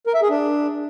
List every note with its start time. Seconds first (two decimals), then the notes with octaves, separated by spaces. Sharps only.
0.07 A#4
0.14 E5
0.22 G#4
0.30 D4